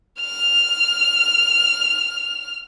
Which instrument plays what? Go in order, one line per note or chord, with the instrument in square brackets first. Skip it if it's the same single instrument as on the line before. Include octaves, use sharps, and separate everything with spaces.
[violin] F6 F7